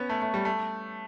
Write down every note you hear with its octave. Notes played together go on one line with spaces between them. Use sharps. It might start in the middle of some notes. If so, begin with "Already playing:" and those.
Already playing: B3 C#4
A3
A3
G3
A3